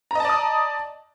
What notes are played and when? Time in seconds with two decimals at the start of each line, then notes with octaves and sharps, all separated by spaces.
0.11 A#5
0.15 D#5
0.20 A5
0.25 D5
0.29 D#6